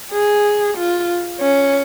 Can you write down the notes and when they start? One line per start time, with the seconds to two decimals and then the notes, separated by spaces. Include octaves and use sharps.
0.12 G#4
0.77 F4
1.41 C#4